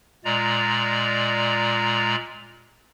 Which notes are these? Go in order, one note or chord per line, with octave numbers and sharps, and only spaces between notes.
A#2 G#3 D5 A#5